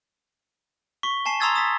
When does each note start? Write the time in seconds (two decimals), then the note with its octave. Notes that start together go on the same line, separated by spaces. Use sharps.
1.03 C#6 B6 G7
1.26 G#5 A5 C7 E7
1.40 A#5 C6 D#6 E6 G#6 A6
1.55 D#6 A6 B6